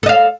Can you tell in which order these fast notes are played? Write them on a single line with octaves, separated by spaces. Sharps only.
A4 D#5 F5